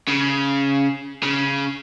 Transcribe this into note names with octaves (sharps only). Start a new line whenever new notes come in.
C#3
C#3